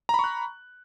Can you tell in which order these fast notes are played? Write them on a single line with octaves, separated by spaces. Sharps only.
A#5 B5 C#6 F#6